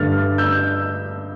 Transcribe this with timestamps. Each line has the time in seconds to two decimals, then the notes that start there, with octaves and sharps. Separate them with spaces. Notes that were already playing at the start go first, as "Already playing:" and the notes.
Already playing: G2 D3 A3 D4 F6 A6
0.38 E6 G6